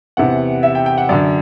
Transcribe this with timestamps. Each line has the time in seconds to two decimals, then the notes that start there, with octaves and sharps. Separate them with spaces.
0.17 E2 C3 E3 F#5
0.63 E5
0.75 G5
0.86 G5
0.98 F#5
1.09 F#2 D3 D5